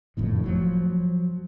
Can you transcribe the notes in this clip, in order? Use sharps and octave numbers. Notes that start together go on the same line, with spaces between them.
F#1 F2 A2 D#3
F3 F#3